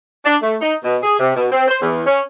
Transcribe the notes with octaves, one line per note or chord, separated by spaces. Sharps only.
D4
A3
D#4
B2
G#4
C3
B2
C4
C5
E2
C#4